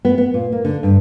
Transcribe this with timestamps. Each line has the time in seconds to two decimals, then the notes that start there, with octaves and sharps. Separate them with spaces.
0.05 B3
0.18 B3
0.34 A#2
0.52 A#3
0.65 D3
0.83 G2